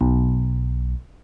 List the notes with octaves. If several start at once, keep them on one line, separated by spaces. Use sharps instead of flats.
B1